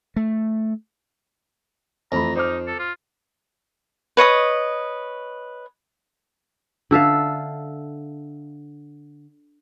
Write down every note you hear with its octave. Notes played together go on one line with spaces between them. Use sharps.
A3
F2 E3 A3 A#5 B5
D#4 C5 D6 F6
A4
F4
B4 C#5 D#5 D#6
D3 A4 E5 F5